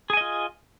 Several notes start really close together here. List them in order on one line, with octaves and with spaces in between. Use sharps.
G#4 G#5 D#5 F4